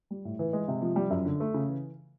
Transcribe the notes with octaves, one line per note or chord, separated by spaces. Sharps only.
G3
A2
E3
G#3
C3
F3
G3
F#2
D3
A3
C#3
E3